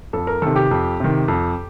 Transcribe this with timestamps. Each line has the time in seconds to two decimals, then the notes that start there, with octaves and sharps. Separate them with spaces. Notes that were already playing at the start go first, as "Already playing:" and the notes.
0.13 F2 A4
0.27 A#4
0.42 C3 D#3 A4
0.56 G4
0.71 F2
1.00 C3 D#3
1.28 F2